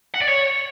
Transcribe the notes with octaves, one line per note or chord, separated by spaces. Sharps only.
F#5
D5
C#5